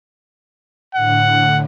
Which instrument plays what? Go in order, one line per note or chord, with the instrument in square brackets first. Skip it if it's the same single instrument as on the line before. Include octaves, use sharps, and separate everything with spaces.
[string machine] A2 D3 [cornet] F#5